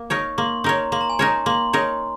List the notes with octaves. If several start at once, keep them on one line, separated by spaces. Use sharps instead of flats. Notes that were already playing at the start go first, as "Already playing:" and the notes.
Already playing: A#3
D#4 A#4 C#5 C#6
A#3 C6
D#4 A#4 C#5 A#5
A#3 C6
A#5
G#5
D#4 A#4 C#5 A#5
A#3 C6
D#4 A#4 C#5